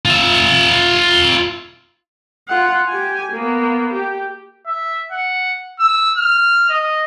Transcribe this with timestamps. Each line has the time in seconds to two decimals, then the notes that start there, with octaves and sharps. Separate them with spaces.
0.05 F4 E5
2.48 F4 F#5
2.88 G4 G#5
3.32 A#3 B3
3.93 G4
4.67 E5
5.12 F#5
5.80 E6
6.17 F6
6.70 D#5